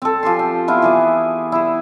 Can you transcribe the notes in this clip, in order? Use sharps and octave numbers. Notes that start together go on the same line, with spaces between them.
C4 A4
F3 G4 G#5 C6
G5
B3 E4 F4
E3 G#4 D6
E4 G#4